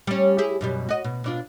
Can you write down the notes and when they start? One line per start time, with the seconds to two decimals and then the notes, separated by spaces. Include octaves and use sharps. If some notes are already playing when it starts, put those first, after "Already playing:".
0.07 G3 C#4
0.38 E4 G4 G#4
0.61 F#2 B2 G3
0.89 F#4 D#5
1.04 B2
1.24 B2 D4 F4